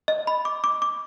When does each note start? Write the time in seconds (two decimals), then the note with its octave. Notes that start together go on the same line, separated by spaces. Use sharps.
0.08 D#5
0.27 B5
0.45 D6
0.64 D6
0.82 D6